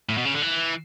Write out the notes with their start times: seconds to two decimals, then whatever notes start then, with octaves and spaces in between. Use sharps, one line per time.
0.09 A2
0.18 B2
0.25 C#3
0.34 D3
0.42 E3